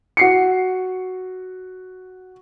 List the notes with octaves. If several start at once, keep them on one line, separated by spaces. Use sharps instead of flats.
F#4 C7 C#7